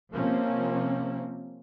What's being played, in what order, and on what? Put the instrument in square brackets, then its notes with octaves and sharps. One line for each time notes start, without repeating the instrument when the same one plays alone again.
[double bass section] C3 F3 A#3 C4 C#4